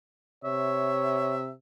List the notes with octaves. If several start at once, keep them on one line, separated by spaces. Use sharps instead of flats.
C3 C#5 E5